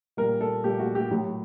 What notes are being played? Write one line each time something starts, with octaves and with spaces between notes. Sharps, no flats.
A#2 G3 A#4
A4
A#2 G3 G4
F#4
G4
A2 F#3